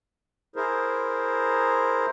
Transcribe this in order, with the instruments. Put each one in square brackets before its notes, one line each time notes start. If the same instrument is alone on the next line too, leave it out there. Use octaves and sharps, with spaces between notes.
[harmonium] E4 G#4 A#4 C5